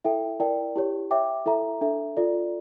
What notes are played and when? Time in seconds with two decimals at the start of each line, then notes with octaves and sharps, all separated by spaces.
0.04 E4 A4 E5 G5
0.40 E4 A#4 D5 G5
0.76 E4 G4 C#5
1.11 C#5 E5 G5 D6
1.46 E4 A4 E5 A#5
1.81 D4 A4 E5
2.17 F4 A4 D5